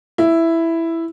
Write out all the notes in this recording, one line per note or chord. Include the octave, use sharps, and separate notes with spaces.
E4